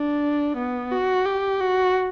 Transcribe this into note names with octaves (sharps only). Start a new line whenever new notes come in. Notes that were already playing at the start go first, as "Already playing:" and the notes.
Already playing: D4
B3
F#4
G4
F#4